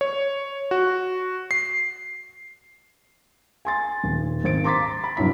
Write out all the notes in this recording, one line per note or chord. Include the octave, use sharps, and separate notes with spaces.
C#5
F#4
C7
G#5 C6 A6
D#1
G#1 C5 A6 D7
A#5 C6 D6 A6 B6
B5
F1 G2 F#3 E4 B6